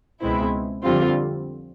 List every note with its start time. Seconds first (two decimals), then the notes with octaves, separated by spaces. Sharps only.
0.21 C#2 B2 G#3 C4 E4
0.83 F2 D3 G3 C4 F4